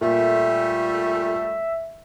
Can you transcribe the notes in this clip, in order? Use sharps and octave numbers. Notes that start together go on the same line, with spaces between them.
A#2 G3 A3 E5